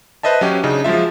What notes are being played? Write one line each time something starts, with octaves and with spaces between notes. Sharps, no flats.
B4 C5 D#5 E5 A5
F#3 C#4 G4
C#3 D4 D#4
F3 F#3 G#3 F4 E5